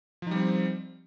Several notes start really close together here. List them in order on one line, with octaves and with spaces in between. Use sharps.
F3 D#4 G3 C4